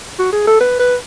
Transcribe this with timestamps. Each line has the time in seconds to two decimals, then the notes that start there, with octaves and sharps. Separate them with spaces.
0.19 F#4
0.32 G#4
0.47 A4
0.60 B4
0.79 B4